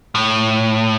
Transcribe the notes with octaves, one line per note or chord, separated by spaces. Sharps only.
A2